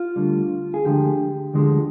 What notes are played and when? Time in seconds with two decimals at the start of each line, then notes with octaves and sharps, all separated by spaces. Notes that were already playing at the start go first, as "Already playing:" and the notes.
Already playing: F4
0.16 D2 D3 G3
0.74 G#4
0.85 D2 D3 F3 G#3 G4
1.54 D2 D3 F3 G#3